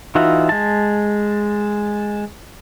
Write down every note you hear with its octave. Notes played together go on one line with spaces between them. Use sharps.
E3 D#4 F4 F#4 E5
G#3 A5